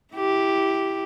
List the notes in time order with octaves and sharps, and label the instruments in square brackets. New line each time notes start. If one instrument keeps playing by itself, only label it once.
[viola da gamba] E4 G4